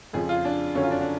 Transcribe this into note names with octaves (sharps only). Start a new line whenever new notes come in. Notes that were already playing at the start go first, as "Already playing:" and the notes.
F2 C#3 F3 G#4
F4
D4
F#2 D3 F#3 C#4
F4
D4
D4